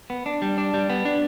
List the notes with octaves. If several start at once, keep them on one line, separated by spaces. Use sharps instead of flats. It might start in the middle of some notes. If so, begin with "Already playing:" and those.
B3
D4
G3
D4
G3
B3
D4